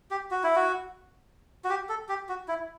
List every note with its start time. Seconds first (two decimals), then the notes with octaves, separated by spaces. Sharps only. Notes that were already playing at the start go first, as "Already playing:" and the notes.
0.11 G4
0.31 F#4
0.44 E4
0.56 F#4
1.64 F#4
1.70 G4
1.89 A4
2.09 G4
2.29 F#4
2.48 E4